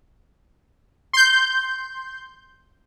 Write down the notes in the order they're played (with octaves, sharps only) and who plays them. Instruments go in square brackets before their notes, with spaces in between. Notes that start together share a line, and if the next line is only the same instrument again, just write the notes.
[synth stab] C6 G6